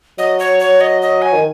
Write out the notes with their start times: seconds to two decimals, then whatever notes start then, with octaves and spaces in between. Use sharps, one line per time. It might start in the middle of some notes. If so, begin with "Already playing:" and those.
0.18 F#3 D#5
0.39 C#5
0.60 C#5
0.81 D#5
1.02 D#5
1.22 G#5
1.33 D#3